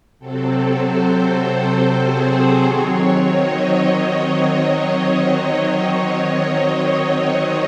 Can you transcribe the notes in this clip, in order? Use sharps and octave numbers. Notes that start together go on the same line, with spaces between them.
C3 F#3 C4 A4
C5
A4
G#4
D#3 F#3 C4 C#5
D#5